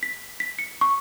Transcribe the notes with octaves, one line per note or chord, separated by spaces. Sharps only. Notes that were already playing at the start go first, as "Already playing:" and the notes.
B6
B6
C#7
C#6